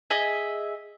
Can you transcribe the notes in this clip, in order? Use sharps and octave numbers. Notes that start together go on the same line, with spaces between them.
G#4 D#5 E5 G#5